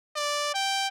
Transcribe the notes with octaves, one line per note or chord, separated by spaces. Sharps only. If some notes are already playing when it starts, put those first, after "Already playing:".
D5
G5